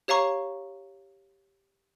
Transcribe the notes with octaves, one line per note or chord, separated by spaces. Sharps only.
G4 C#5 F5 A#5 C#6